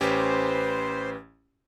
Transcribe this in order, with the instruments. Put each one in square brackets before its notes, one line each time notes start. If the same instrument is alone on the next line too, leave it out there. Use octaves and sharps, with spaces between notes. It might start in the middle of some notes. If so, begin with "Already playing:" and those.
[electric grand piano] A1 C#4 G4 [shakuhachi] B4 [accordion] C5